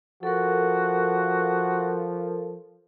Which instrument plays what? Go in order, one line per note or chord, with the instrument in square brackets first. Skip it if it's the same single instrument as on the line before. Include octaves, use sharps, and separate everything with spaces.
[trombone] F3 [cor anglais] F#4 [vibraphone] A4 A#4